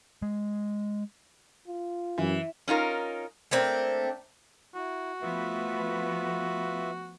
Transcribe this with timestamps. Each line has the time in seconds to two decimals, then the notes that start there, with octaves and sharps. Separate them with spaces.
0.22 G#3
1.67 F4
2.18 F#2 E3
2.68 C#4 D#4 F4 A#4
3.51 A3 A#3 C4 D4
4.75 E4 F#4
5.22 F3 A3 B3 F4 B4 E5